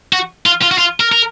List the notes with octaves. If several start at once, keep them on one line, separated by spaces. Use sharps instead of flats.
F#4
F4
F4
F#4
F4
A#4
A#4